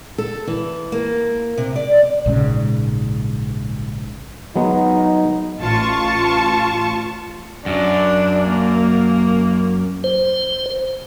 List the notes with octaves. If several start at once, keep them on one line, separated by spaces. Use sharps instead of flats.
A4
E3
A#3
C3
D5
A#1 G#2 C#3
F#3 G#3 B3 D#4
A1 F4 A5 C#6
F#2 D4
A#3
C5